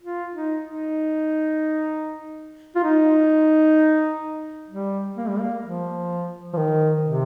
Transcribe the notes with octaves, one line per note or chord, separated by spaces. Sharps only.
F4
D#4
D#4
F4
D#4
G3
A#3
G3
A#3
F3
F3
D#3
C3